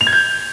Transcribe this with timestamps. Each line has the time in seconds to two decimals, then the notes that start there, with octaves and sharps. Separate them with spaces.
0.01 F7
0.07 G#6
0.13 G6